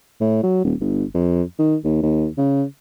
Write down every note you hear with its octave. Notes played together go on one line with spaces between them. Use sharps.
A2
F#3
D#1
G1
F2
D#3
D#2
D#2
C#3